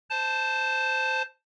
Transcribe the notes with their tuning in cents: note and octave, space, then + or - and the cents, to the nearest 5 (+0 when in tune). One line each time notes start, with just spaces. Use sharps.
C5 -10 A5 +0